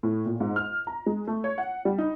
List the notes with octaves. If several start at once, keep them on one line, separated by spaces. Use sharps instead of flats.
A2
A#2
G#2
F6
A#5
G#3
A3
C#5
F#5
G3
D#4